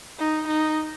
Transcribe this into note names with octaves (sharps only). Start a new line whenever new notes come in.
D#4
D#4